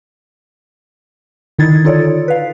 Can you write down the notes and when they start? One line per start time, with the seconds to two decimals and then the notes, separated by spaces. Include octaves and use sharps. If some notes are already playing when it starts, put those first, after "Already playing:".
1.59 D3 D#3 D#4 E4 G#6 A6
1.85 D#4 F4 A4 C#5 D5
2.28 B4 F5